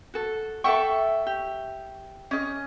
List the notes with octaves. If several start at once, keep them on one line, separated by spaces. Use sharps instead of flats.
F#4 A4
A4 E5 F#5 G5 C#6
G4
C#4 D#5